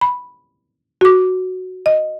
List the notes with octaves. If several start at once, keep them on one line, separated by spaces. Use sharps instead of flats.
B5
F#4 D6
D#5